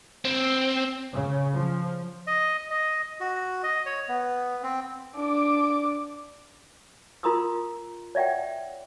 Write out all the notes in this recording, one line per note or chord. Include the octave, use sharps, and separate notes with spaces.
C4
C#3
F3
D#5
D#5
F#4
D#5
C#5
B3
C4
D4 D6
F4 A#4 A#5 C6 D#6 E6
C#5 D5 E5 F#5 G5